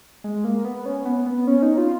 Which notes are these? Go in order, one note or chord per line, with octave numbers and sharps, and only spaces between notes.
G#3
A#3
B3
C#4
B3
B3
C#4
D#4
F4